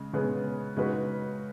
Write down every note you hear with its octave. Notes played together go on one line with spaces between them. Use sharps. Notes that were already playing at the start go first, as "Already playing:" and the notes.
Already playing: C#3 G#3
C#3 G#3 B3 G#4
C#3 G#3 D#4 F#4 B4